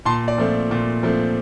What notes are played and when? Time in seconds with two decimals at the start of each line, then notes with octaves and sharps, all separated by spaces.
0.05 A#2 A5 C6
0.28 D5
0.38 F3 A3 C4
0.71 A#2
1.03 F3 A3 C4